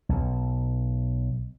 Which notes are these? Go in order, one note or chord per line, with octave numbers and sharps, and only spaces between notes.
B1